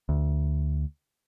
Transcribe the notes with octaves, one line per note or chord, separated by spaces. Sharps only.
D2